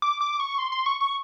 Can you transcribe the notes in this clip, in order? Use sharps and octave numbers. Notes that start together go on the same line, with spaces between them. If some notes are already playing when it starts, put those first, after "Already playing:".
D6
D6
C#6
C6
C6
C#6
C#6